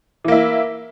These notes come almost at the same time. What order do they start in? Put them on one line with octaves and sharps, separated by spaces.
E3 A#3 E4